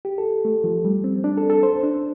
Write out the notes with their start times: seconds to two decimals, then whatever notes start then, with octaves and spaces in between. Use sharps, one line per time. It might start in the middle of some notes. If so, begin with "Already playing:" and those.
0.05 G4
0.18 A4
0.45 A3
0.64 F3
0.85 G3
1.04 C4
1.24 D4
1.38 A4
1.50 A4
1.63 C5
1.83 D4